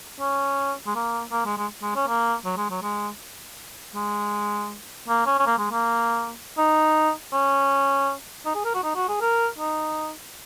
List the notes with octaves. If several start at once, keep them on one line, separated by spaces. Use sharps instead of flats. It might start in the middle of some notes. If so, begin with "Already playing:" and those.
C#4
G#3
A#3
A#3
G#3
G#3
G#3
C#4
A#3
F#3
G#3
F#3
G#3
G#3
A#3
C#4
C#4
A#3
G#3
A#3
D#4
C#4
D#4
G#4
A#4
F#4
D#4
F#4
G#4
A#4
D#4